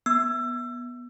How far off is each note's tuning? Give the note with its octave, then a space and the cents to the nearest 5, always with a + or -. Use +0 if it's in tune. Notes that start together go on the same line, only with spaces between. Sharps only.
B3 -15 E6 +25